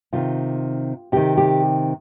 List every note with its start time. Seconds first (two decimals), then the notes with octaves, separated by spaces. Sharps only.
0.13 C3 D#3 F4
1.12 C3 D#3 G4
1.37 G4